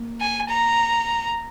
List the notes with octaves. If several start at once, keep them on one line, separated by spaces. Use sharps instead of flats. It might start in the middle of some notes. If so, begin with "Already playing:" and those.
Already playing: A#3
G#5
A#5